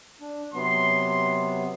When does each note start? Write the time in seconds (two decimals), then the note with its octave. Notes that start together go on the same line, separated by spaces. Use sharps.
0.21 D4
0.54 C3 F#3 B3 C6